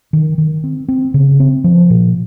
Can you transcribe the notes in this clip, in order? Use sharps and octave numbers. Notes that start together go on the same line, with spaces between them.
D#3
D#3
C4
C4
C#3
C4
F3
A#2